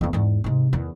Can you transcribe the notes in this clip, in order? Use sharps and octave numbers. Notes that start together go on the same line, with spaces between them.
E2 B3
E2 G#2
G#2 C3
E2 D#3